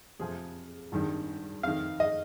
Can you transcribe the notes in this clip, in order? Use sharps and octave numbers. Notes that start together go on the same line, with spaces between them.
F2 C3 F3 G#4
G#1 G2 D#3
F2 D#3 F5
D#5